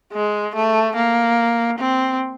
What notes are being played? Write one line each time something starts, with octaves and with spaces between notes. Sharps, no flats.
G#3
A3
A#3
C4